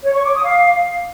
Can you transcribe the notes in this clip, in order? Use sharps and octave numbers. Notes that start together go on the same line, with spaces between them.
C#5
C#6
D6
D#6
F5